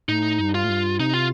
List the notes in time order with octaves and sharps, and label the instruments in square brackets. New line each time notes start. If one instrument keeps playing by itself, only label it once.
[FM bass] A2 [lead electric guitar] D#4
[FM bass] G2
[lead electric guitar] F4
[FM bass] A2
G2
[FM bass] C3 [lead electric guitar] D#4
[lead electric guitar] F4